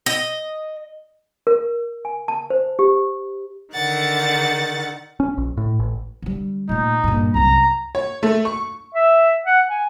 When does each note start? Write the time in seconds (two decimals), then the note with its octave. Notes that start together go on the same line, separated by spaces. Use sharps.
0.06 D#5
1.47 A#4
2.05 G#5
2.28 A5
2.50 C5
2.79 G4
3.74 D3 D#3 F#5 A6
5.20 C#4
5.38 A#1
5.57 A2
5.79 A1
6.22 D3 G3
6.69 A#2 A3 D#4
7.04 G2 A#2
7.34 C2 F#2 A#5
7.95 C#5
8.23 A3
8.45 C#6
8.94 E5
9.45 F#5
9.69 G#5